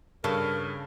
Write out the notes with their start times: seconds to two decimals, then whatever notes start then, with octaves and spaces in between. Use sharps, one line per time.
0.24 G2 C#3 A4 A#4